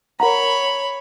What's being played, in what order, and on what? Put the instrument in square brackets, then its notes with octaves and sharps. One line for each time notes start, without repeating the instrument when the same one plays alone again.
[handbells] A#4 F#5 A#5 [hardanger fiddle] C#5 B5